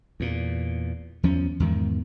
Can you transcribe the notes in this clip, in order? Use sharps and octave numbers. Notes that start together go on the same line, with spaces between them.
E2 A#2
E2 F3 C#4
E2 G#2 D#3